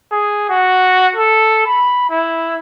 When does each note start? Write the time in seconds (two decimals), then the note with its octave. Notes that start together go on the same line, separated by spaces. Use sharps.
0.11 G#4
0.49 F#4
1.15 A4
1.66 B5
2.10 E4